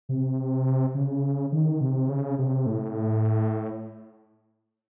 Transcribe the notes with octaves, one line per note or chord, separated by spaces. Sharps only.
C3
C#3
D#3
C3
C#3
C3
A2